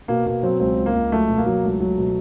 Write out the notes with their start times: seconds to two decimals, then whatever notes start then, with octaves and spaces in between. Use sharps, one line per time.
0.08 B2 A#3
0.26 B2 A#3
0.43 F#3 C4
0.60 C#2 C4
0.78 C#2
0.86 A#3
0.95 C#2
1.12 F#3 A3
1.29 B2
1.38 A#3
1.46 F#3
1.64 C#2 A3
1.80 F#3
1.98 B2